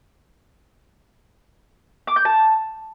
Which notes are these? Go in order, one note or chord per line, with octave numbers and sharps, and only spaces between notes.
D6
G6
A5